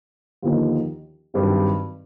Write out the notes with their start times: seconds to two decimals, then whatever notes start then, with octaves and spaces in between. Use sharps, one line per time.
0.42 D#2 D3 F3 A#3 D#4
1.34 G#1 G2 D#3 F#3